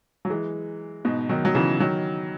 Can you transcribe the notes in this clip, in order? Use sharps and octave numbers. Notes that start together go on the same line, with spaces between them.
F#3
E3 G#3
G#2 B2
D#3 F#3
F#3
C#3 E3
D#3 F#3